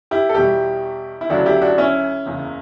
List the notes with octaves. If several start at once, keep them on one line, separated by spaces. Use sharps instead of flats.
E4 G4
A4
E2 B2 G3 E4 G4
E4
D2 C#3 F#3 D4 F#4
E4 G4
D4 F#4
C#4 E4
F#1 E2 C#3